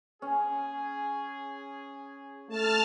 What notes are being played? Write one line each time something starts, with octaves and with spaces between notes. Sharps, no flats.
C#4 G#4
A3 A5 F6